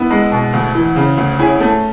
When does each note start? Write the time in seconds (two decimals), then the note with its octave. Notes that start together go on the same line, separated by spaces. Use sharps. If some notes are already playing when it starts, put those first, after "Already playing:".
Already playing: B3 E4
0.10 G#3
0.32 B2
0.53 D2
0.75 E3
0.96 C#3
1.17 D2
1.39 C#4 E4 G#4
1.60 A3